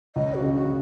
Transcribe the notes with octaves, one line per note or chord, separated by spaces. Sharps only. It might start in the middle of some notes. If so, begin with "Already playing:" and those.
C#2 D#5
F#4
C#3
F#4
C#3